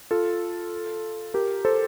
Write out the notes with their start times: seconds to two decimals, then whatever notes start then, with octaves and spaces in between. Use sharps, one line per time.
0.11 F4 A4
1.34 G4 A#4
1.65 A4 C5